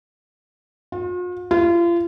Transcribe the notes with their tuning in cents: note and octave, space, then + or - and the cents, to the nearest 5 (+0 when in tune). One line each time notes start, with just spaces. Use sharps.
F4 +45
F4 -35